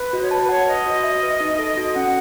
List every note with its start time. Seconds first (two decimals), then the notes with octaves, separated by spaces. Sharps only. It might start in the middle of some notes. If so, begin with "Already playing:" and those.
Already playing: B4
0.13 F#4 D#5
0.21 C#5
0.31 B4 A5
0.42 B4
0.49 C#5 F#5
0.67 B4 D#5
0.86 F#4
1.04 E5
1.23 B4
1.40 D#4
1.59 A4
1.77 F#4
1.95 C#4 F#5